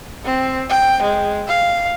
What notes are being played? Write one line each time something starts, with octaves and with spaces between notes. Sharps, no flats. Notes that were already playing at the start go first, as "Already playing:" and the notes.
C4
G5
G#3
F5